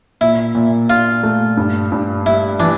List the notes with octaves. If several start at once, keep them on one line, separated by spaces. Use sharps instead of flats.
A#2 E4
A#2
D4 F4
A3
G2
G2
G3 E4
E3 D4